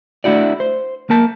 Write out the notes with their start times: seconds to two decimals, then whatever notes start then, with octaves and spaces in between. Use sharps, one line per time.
0.24 A3 D4 E4 F#4 D5
0.60 C5
1.10 A#3 A#4 A5